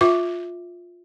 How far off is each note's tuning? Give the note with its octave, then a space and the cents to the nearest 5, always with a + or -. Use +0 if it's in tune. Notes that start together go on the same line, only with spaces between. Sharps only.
F4 +15 E5 +0 D6 +0